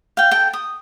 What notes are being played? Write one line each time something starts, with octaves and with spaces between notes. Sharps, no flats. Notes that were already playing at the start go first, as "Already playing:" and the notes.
F5 G5
A4 G5
D#6